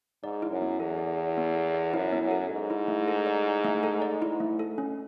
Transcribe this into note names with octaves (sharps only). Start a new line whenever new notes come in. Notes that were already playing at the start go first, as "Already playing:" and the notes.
G#2 D5
E4
F#2
B3
E2 A4
D5
E4
B3
A4
D5
F#2 E4
B3
F#2
A4
G#2 D5
E4
A3
A4
D5
E4
A3
A4
D5
E4
A3
A4
C#4